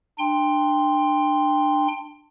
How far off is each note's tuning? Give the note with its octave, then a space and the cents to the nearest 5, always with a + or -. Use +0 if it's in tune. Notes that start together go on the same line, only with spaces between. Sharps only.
D4 +25 G5 +20 C6 +0